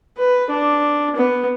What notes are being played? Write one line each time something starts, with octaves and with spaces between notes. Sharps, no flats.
B4
D4
B3